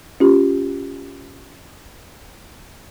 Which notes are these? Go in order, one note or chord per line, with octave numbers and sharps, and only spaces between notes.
C#4 F4 G4